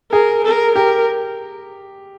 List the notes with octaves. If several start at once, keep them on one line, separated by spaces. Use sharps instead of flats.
G#4 A#4
A#4
G4 A#4